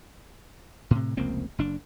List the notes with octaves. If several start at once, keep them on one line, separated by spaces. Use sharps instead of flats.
A2 C3
F1 C#2 A#3 C4
F#1 D4